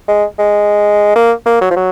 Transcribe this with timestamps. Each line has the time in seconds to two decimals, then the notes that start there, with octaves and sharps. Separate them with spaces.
0.08 G#3
0.39 G#3
1.15 A#3
1.46 A#3
1.61 F#3
1.71 F3
1.76 F#3